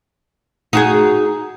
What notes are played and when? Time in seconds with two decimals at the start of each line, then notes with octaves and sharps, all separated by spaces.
0.73 D#4 F#4 G#4